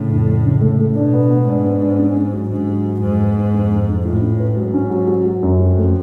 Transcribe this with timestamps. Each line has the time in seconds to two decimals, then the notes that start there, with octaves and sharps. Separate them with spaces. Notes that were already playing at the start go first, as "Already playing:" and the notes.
Already playing: A2 C#3
0.11 F2
0.27 A3
0.45 C#3
0.61 A3
0.79 A3
0.95 B2 D4
1.13 B3
1.31 B3
1.47 G#2 D4
1.64 B3
1.81 D4
1.98 C#4
2.16 C#4
2.33 F#3
2.50 G#2 D3
2.67 F#3
2.84 F#3
3.01 F2 G#2
3.20 B3
3.36 B3
3.54 F2
3.71 F2
3.88 F2
4.04 A2 F4
4.21 C#4
4.39 B4
4.56 G#2 F#3
4.74 C#4
4.90 F#3
5.07 F#3
5.25 F#3
5.43 F#2
5.59 F2 F#3
5.77 A3